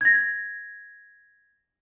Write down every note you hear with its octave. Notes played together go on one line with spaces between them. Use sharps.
G#6 A#6